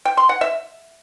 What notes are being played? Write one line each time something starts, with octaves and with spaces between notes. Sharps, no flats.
G5
C6
F#5
E5